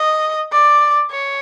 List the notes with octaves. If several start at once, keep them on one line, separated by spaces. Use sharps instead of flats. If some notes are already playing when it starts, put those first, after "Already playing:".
Already playing: D#5
D5
C#5